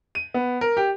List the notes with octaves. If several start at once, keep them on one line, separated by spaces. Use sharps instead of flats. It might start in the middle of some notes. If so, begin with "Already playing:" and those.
D#7
B3
A#4
G4